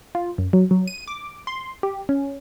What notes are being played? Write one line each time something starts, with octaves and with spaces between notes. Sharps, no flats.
F4
F#2
F#3
F#3
D#7
D6
C6
G4
C#4